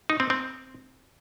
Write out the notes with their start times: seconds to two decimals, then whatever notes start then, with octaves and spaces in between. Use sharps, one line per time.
0.10 D#4
0.20 C4
0.30 C4